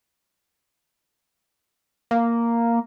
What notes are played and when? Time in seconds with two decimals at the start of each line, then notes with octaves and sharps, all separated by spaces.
2.11 A#3